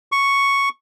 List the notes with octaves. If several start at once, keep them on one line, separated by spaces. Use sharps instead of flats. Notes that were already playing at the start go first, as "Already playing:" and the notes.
C#6